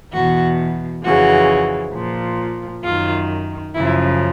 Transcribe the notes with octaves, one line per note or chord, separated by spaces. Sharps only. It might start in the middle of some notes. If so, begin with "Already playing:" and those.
E2 B2 F#4
F2 C#3 E3 F#4
A#2 F3
F#2 D#3 F4
F#2 C#3 F3 E4